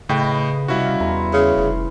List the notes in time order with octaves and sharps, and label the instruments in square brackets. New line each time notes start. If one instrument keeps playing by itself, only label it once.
[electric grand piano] A2 G5 [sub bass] C#3 [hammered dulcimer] B4 D#5
[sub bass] C3 [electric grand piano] G3 E4 F#4 [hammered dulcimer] C#4 D#5 F5
[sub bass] E2 [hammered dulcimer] E3 A#5 C6
[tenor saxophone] C#3
[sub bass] F1